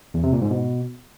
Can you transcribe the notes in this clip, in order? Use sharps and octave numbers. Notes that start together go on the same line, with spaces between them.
E2
C3
A#2
G#2
B2